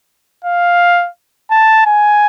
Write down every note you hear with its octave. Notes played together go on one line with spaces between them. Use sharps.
F5
A5
G#5